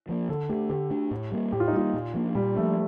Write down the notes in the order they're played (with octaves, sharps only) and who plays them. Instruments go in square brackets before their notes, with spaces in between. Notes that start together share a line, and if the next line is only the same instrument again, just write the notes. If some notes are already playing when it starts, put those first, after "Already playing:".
[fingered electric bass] F3 A#3
[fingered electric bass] D3 [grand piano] A4
[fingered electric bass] A3 D4 [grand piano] G4
[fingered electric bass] D3 [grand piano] G4
[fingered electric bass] A3 D4
A2
G3 A#3
[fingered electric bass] A2 [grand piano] G4
[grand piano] F4
D#4
[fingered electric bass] G3 A#3 [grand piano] F4
[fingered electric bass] A#2
F3 A#3 D4
[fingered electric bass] A#2 [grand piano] G3
[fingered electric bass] F3 A#3 D4 [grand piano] A3